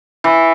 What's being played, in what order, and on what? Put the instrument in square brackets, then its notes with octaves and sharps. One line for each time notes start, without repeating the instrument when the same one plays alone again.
[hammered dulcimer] E3